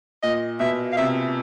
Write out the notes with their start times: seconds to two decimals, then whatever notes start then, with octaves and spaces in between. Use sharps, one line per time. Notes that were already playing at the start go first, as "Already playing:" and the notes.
0.23 A#2 D#5
0.60 B2 E5
0.93 F5
0.97 C3 E5